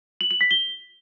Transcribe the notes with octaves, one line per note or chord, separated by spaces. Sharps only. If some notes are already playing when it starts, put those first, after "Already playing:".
F#7
F#7
B6
G7